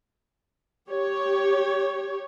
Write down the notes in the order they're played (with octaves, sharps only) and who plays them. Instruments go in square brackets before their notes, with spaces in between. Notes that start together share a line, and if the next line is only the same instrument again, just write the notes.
[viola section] G4 C#5